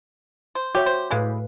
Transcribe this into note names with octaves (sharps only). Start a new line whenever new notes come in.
C5
F#4 G4 C#5 E5
C5
A2 E3 G#3 B4 F5 G#5